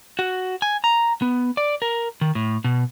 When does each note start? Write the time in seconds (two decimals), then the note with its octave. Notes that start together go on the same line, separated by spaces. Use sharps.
0.19 F#4
0.62 G#5
0.84 A#5
1.22 B3
1.57 D5
1.82 A#4
2.21 D#3
2.35 A2
2.64 B2